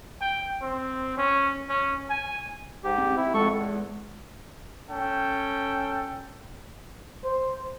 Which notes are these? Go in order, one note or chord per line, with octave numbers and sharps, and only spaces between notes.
G5
C4
C#4
C#4
G#5
G#2 G4
C4
E4
F2 G#3 A4 F#5 C#6
E2
C#4 A4 G5
C5